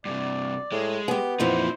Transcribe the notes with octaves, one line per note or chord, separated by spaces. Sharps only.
G2 C3 D5
A2 G#3
B3 G4 G#4
F2 A#2 E3 D#4 E4 C5